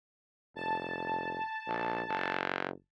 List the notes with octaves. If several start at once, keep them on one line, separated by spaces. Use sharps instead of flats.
F1 A5
A#1
F#1